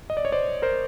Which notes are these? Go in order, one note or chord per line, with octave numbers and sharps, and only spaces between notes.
D#5
D5
C#5
C5 D5
A#4 C5